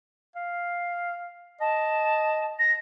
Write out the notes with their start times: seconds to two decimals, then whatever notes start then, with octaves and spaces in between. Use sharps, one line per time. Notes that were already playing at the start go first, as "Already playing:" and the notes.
0.36 F5
1.61 D#5 A5
2.59 A#6